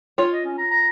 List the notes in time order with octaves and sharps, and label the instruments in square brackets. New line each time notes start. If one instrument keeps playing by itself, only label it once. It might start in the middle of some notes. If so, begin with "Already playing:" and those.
[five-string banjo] F4 C#5
[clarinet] D#5
C#4
A#5
A#5